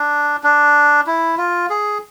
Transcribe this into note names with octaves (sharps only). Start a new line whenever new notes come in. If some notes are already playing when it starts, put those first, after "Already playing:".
Already playing: D4
D4
E4
F4
G#4